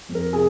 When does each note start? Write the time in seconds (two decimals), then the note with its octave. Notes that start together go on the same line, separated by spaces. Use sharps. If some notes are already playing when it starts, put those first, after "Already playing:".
0.09 F2
0.15 A#4
0.33 C3 G#4 G#5